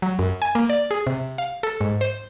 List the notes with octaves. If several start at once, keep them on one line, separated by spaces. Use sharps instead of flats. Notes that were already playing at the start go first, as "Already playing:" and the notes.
F#3
F#2
G#5
A#3
D5
G#4
C3
F5
A4
G#2
C5